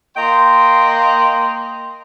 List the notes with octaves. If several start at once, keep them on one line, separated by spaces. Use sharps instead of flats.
A#3 D#5 G5 A#5 C6